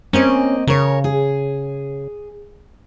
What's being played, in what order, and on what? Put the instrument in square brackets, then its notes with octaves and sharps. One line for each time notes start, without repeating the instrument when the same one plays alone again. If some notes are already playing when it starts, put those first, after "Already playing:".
[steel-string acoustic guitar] A#3 C4 D#5 [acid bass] C#4
[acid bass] C#3 [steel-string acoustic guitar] A#4 C#5
[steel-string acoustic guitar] G#4